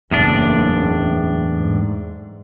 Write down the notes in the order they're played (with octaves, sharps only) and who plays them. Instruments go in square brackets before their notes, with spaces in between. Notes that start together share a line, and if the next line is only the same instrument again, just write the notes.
[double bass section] F#1 [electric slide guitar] E2 A2 D4
[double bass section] G#2